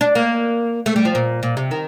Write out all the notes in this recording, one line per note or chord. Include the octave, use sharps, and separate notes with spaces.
D4
A#3
A3
G3
F3
A#2
A#2
C3
D#3